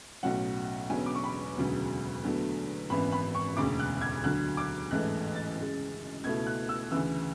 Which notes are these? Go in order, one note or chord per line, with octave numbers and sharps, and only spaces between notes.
B1 A2 F#3 C#4 F#5
E1 E2 D3 F#3 C#4 G#5
D6
C#6
B5
E1 D2 C#3 F#3 B3
E2 D3 F#3 A3
G#1 F#2 E3 B3 B5
B5
C#6
E1 D2 C#3 D6
F#6
G#6
D2 D3 F#3 F#6
D6
A1 G#2 E3 A3 F#6
A6
F#2 C#3 G#3
C#2 B2 A3 E4 G#6
F#6
E6
D2 C#3 E3 E6